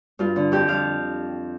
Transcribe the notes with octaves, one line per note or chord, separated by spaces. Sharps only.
G2 F4
D3
F2 G4
F3 F5